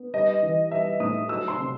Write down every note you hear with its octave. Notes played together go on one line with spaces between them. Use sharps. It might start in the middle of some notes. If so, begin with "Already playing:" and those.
Already playing: B3
G3 D#5
E3
G3 E5
A2 D#6
F#3 E6
C6
C3